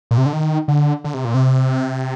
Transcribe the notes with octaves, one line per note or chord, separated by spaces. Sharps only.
A#2
C3
D3
D#3
D3
D3
C3
A#2
C3